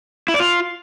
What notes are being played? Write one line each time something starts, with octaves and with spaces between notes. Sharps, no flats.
E4
D5
F4